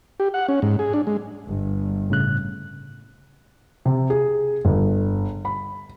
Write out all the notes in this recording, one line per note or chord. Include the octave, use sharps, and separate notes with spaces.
G4
F#5
C#4
G#2
G#4
D4
G#3
G1
A2 C#3 F#6
C3
G#4
G1
B5